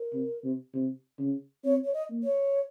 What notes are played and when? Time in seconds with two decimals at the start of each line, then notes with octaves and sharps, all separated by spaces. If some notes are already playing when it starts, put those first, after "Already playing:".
Already playing: A#4
0.13 C3
0.44 C3
0.74 C3
1.18 C#3
1.64 C4 C#5
1.84 C#5
1.94 D#5
2.09 A#3
2.23 C#5